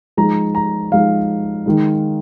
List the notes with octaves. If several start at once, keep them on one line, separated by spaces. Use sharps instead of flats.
F3 G#3 D#4 A#5
A#5
F3 G#3 D#4 F5
D#3 G#3 D#4